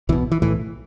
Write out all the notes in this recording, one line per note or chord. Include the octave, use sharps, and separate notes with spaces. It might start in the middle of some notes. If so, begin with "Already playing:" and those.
B1 B2 E3
E3
B1 A2 E3